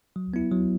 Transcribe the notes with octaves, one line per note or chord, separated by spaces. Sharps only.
F#3
B3 E4
F#3